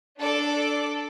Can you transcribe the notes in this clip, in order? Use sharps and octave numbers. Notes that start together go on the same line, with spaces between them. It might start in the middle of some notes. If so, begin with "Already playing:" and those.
D4 A4 D5 D6